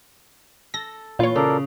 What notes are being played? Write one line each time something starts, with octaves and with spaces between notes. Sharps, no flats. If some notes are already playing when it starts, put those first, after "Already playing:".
A4 A#6
A#2 E3 F4 C#5
C#3 A4 A#4 D5